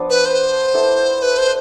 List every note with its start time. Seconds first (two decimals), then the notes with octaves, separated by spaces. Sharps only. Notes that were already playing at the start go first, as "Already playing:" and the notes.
Already playing: F3 B3 D4
0.10 B4
0.25 C5
0.74 B3 E4 A4 D5
1.22 B4
1.38 C5